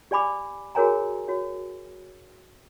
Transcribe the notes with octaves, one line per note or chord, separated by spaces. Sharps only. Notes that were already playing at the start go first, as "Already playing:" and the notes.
G4 D5 G#5 B5 D6
F#4 G#4 A#4 C#5 G#5 A#5
F#4 C#5